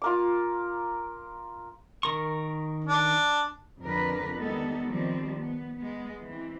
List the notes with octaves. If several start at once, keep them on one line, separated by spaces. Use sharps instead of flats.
F4 A#4 D6
D#3 A#4 C#6
D4
F2 D3 A#4 B4
D#3 G3 G#3 B3 D#4 A4
D#3 F3 G3 C4
B3
G#3 B3
E3 C4